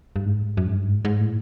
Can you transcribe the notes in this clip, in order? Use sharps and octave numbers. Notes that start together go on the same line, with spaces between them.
G2
G#2
F#2
G#2
G2
G#2
G#2
A2